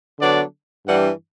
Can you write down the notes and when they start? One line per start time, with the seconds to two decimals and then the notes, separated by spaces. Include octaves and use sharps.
0.19 D3 F#3 B3 D4 D5
0.86 G2 E3 G3 D4 F#5